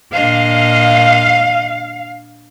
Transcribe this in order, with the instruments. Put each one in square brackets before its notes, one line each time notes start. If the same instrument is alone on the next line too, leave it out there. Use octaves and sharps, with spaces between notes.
[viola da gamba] A#2 D4 D#5 [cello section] F5